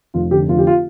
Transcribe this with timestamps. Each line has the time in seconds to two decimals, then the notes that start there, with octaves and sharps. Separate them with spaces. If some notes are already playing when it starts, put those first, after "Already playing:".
0.14 F1 F4
0.31 D3 G4
0.48 F1 F4
0.58 G4
0.67 F4